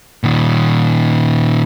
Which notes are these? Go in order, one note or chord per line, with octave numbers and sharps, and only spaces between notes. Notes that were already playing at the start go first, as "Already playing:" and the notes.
A#2 D#3